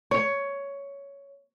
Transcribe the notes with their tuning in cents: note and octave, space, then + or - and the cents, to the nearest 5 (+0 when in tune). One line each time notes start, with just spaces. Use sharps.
C#5 +10